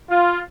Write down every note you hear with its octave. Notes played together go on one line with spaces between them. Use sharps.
F4